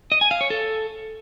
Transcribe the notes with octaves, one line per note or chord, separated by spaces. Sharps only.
D#5
G#5
F5
C#5
A4